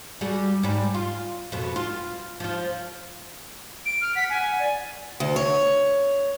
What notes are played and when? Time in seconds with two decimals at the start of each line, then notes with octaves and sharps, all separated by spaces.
0.21 G3 F#4 G#4
0.63 G#2 G3
0.95 F4
1.52 F2 B2
1.76 F4
2.40 F3 F4
3.86 D7
4.01 F6
4.16 F#5 B6
4.30 G#5
4.59 D5
5.20 D2
5.36 C#5